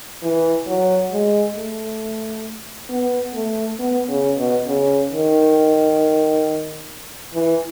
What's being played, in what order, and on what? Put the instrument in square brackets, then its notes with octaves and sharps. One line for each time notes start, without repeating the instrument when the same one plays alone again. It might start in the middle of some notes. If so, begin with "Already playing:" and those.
[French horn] E3
F#3
G#3
A3
B3
A3
B3
C#3
B2
C#3
D#3
E3